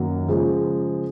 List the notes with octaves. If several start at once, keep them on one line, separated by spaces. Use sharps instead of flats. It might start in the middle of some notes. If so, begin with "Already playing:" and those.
Already playing: F#2 D#3 F#3 A#3
C#3 F3 G#3